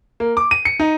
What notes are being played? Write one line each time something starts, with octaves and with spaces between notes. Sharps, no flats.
A#3
D6
D#7
C#7
D#4